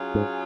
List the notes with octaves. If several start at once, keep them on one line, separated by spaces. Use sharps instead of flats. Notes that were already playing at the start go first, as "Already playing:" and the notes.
Already playing: F#3 C#4 F4 G#4
G#2